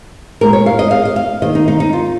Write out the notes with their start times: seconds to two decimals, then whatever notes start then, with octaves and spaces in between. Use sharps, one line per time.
0.41 A#2 G#3 A#4
0.53 C#5
0.66 F5
0.79 D#5
0.91 F5
1.05 D#5
1.16 F5
1.42 D#3 A#3 D#5
1.55 D#4
1.68 D#4
1.80 D#4
1.93 F4